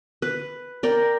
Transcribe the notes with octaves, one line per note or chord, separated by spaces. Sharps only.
B4
A#4 D5 G5